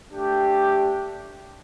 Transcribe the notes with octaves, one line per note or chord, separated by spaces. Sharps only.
A3 D4 G4